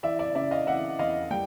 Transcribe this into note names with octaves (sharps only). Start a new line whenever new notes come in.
E3 D5 E5
D5 E5
C#3 D5 E5
D#5 F5
E3 E5 F#5
E2 D#5 F5
G3 G5